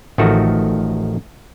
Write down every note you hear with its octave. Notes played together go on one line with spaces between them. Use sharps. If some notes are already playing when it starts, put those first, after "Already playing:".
A1 D#3 F3 A3 D#4 F#4